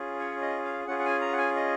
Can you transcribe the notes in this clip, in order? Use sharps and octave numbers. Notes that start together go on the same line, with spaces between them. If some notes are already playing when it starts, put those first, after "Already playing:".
Already playing: C#4 F4 G#4
C#5
D#5
F5
C#4 F4 G#4 F#5
F#5
G#5
A#5
F#5
G#5
D#5